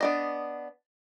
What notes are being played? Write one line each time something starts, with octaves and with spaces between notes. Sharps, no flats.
B3 D4 D#5